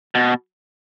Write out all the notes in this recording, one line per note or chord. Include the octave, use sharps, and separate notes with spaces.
B2